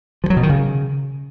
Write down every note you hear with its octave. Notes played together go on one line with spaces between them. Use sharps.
F3
F#3
B2
D#3
C#3